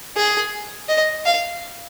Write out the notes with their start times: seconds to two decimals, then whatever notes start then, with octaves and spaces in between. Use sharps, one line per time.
0.17 G#4
0.89 D#5
1.25 F5